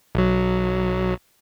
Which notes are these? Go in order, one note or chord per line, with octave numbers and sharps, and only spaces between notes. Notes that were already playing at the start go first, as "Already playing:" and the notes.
B1 F#3